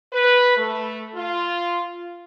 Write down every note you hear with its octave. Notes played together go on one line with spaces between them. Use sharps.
B4
A3
F4